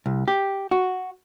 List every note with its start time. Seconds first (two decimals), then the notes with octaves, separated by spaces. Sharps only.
0.06 C2
0.28 G4
0.71 F#4